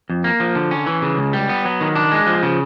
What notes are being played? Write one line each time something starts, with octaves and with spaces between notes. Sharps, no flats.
F2
A#3
F3
D3
C#4
E3
C#3
C#2
G3
B3
F#3
D#3
D4
G#3
F3
C#3